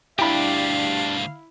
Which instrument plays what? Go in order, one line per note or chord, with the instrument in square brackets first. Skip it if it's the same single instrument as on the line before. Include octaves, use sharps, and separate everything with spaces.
[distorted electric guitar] D2 G2 [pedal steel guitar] D4 G4 [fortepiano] E4 B5 [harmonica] F5